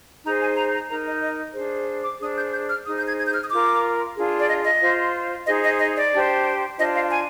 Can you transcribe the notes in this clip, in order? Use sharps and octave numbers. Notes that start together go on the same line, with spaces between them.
D#4 G#4 C5 A#5
G#5
A#5
A#5
D#4 A#4 A#5
D#5
D#5
D4 G#4 C5
D6
D4 G#4 C5 D#6
G6
G6
F6
D#4 G#4 C5 D#6
G6
G#6
G#6
G6
F6
D#6
F4 A#4 D6
D4 F4 G#4
D5
D#5
D#5
F4 C5
D#4 G#4 C5 D#5
D#5
D#5
D5
D4 G4 C5
D4 F4 C5 D#5
F5
G#5